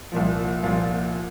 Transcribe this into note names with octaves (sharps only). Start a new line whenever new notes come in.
C2 A#2 F3
C2 A#2 F3 F4